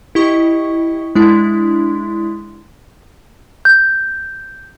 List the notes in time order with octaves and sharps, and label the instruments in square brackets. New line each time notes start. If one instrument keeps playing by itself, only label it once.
[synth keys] E4 G4 D#5 C#6
G#3 D4 E4
[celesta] G6